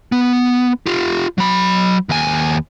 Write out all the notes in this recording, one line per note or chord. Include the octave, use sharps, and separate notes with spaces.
B3
F4 G4
F#3 B5
D#2 G#5